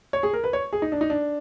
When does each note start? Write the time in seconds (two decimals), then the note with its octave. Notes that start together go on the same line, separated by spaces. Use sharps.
0.13 C#5
0.23 G#4
0.33 A#4
0.44 B4
0.53 C#5
0.73 G#4
0.82 D#4
0.92 D4
1.01 D#4
1.10 D4